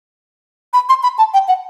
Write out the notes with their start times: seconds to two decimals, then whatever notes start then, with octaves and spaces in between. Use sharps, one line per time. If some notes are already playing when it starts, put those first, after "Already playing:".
0.73 B5
0.89 C6
1.03 B5
1.18 A5
1.34 G5
1.48 F#5